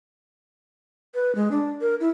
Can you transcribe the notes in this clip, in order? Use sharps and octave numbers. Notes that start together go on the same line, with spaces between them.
B4
G#3
D4
A#4
E4